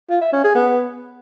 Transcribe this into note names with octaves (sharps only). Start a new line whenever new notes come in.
F4
E5
C#4
G#4
B3